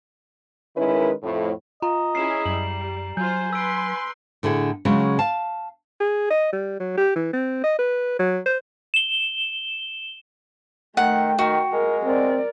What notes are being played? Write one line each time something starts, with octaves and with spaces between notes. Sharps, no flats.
D#3 G#3 C#4 E4 A#4 B4
F2 A2
F4 D#5 A#5
C#4 E4 G#4 C7 E7
F#2 G3 F#7
F#3 F4 C5 G#5 G6
B4 C6 E6 D7
A2 D3 E4 G#4 F#5
C#3 F#3 G#3 C#4
F5 A5
G#4
D#5
G3
F#3
G4
E3
C4
D#5
B4
F#3
C5
E7 G7
D#3 A3 F#5 G5
D#3 F#4
G#3 A#4
C4 A#4 D5